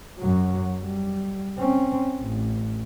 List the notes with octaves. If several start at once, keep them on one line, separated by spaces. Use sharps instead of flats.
F#2 F#3
G3
C4 C#4
A1